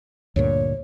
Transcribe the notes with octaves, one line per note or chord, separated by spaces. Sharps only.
D2 G2 A#2 C#5